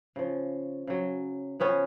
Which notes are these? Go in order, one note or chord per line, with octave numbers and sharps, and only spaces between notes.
C#3 F3
C#3 F#3
C#3 F3 B3 C#4